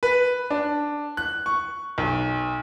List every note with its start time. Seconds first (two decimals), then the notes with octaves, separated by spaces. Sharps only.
0.03 B4
0.50 D4
1.17 F#6
1.46 C#6
1.98 B1